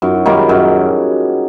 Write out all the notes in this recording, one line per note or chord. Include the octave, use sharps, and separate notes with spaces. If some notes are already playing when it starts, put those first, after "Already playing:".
F#2 D#4 F4
E4 F#4
D#3 G3 A#3 F4 G4
F#4 G#4
F#2 G#4 A#4
G#4 A#4